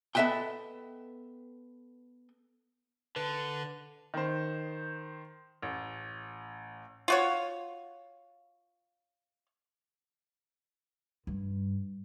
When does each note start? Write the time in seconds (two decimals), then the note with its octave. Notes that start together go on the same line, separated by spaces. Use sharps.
0.15 B3 A4 D#5 E5 F#5 G5
3.16 D3 B4
4.14 D#3 C5
5.62 A1
7.08 F4 F#4 C#5
11.27 G2